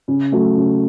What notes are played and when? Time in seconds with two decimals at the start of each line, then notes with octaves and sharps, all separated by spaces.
0.08 C#3
0.32 F#3 A3
0.56 C#3